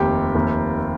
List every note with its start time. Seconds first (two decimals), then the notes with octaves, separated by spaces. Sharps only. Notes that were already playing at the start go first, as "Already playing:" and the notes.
Already playing: F1 D#2 D#3 G4
0.35 F1 D#2 D#3